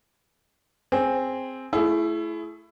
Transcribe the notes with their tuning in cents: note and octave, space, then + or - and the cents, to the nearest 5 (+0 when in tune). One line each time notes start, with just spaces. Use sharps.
C4 +0 G#4 -5
A3 +0 E4 +20 G#4 +30